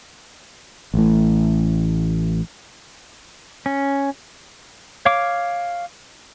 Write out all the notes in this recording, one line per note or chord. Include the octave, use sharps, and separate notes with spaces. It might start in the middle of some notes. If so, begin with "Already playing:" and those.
A1 A2
C#4
C#5 F5 D6